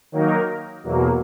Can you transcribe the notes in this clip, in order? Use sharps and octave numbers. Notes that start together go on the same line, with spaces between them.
D#3 F#3 A#3 D#4 A#4
E2 B2 F#3 A#3